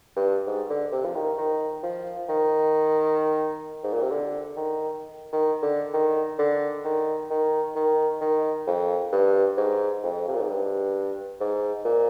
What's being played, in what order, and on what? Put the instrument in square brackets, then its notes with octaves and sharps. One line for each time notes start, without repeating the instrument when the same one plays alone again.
[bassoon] G2
G#2
D3
C3
F3
D#3
D#3
F3
D#3
G#2
A#2
C3
D3
D#3
D#3
D3
D#3
D3
D#3
D#3
D#3
D#3
F2
G2
G#2
F2
C3
A#2
G#2
G2
G#2
A#2